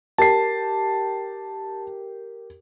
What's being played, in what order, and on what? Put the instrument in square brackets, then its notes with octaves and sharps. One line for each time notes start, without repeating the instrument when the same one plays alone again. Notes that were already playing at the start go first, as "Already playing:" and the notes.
[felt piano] G4 A#4 [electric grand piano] A5 C7